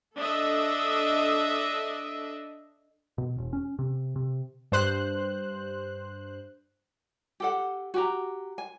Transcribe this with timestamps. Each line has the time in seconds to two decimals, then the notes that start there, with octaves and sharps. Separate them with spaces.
0.16 D4 A4 D#5 E5
3.18 B2
3.38 E1
3.53 C#4
3.79 C3
4.16 C3
4.72 G2 C5 F#6
7.40 G4 A4 F#5
7.94 F#4 G4 A#5
8.58 G#5